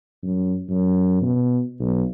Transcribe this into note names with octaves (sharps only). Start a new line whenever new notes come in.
F#2
F#2
B2
B1